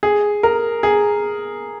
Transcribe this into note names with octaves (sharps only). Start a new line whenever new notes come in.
G#4
A#4
G#4